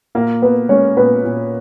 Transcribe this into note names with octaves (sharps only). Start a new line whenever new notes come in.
A#2 A#3 A#4
B3 B4
G#3 C#4 C#5
A#2 B3 B4
A#2